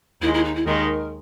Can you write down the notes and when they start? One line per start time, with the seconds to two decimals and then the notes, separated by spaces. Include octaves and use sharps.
0.21 D#2 D#3 G#3 E4
0.33 E4
0.44 D#4
0.55 E4
0.66 D#2 D#3 G#3 D#4 A#4